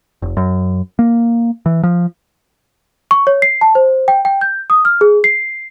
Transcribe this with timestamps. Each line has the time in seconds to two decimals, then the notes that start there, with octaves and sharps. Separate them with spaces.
0.22 F1
0.37 F#2
0.99 A#3
1.66 E3
1.84 F3
3.11 C#6
3.27 C#5
3.42 C7
3.61 A5
3.75 C5
4.08 G5
4.25 G5
4.41 G6
4.70 D#6
4.85 F6
5.01 G#4
5.24 C7